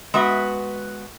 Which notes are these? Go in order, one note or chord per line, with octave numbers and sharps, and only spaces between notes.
G#3 B3 F#4 E5